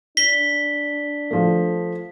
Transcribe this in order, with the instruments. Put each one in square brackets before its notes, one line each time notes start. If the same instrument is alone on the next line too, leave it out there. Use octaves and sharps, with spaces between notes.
[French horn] D4 [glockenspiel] B6 G7
[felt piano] F3 A3